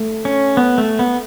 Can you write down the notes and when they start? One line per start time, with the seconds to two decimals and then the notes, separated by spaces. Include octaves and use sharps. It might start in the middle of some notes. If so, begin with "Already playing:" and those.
Already playing: A3
0.25 C#4
0.57 B3
0.78 A3
0.99 B3